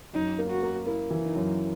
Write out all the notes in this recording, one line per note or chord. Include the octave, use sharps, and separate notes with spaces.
F#2 D#4
A#3
F#4
A#3
A#3 E4
E3
D#4
F#2